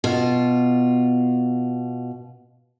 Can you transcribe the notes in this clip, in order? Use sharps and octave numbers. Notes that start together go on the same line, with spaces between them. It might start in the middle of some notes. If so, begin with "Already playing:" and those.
B2 F4